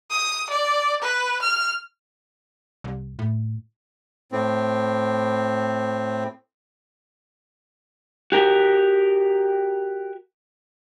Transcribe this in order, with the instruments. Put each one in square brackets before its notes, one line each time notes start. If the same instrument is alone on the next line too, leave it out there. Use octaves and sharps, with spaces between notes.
[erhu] D#6
D5
B4
F6
[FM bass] C2
A2
[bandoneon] A2 C4
[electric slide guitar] F#4 G4 A#4